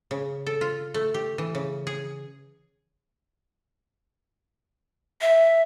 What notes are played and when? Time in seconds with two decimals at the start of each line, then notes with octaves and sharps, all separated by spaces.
0.11 C#3
0.46 A4
0.61 F4
0.94 A3
1.14 G4
1.38 E3
1.55 C#3
1.87 G#4
5.21 E5